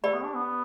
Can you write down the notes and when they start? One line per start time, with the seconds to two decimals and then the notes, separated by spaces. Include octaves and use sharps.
0.04 A3 G4 D5 B5
0.14 B3
0.24 D4
0.35 B3